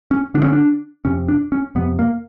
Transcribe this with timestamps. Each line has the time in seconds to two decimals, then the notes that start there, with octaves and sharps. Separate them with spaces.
0.11 C#4
0.34 D3 D4
0.39 G2
0.43 C#4
0.53 D4
1.05 F2 C3 C#4
1.28 D4
1.52 C#4
1.75 F2 C3 B3
1.99 A#3